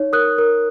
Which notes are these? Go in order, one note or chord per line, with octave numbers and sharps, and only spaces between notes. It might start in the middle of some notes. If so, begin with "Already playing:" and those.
Already playing: D#4 C#5
A#4 D#6 F#6
A#4